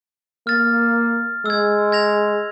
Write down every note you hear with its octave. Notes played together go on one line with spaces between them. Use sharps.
A#3 F6 A6
G#3 E6 G#6
G#6 A#6 F7